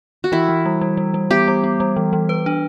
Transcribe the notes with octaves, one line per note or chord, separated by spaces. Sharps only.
F#4
E3 E4
E3
G3
G3
G3
G3
B3 G4
G3
B3
G3
E3
E3
B4
D4